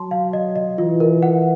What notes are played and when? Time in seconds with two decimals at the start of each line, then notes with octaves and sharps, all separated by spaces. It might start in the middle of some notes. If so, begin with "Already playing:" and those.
Already playing: F#3 A5 C6
0.11 F5
0.33 D#5
0.56 D#5
0.78 E3 F4
1.00 A#4
1.23 F#5